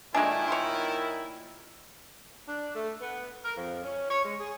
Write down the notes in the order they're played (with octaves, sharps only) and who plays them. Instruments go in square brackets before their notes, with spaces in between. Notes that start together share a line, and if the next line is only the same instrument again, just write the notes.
[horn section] A#2 D#3 E4 [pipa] G#3 A3 D4 [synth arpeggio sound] G#5
[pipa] C#5 C6
[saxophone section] D4
A3
B3
A#4
F2
C#4
C#5
G#3
G#4